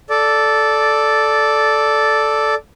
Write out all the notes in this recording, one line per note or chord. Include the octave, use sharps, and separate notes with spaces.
A4 D5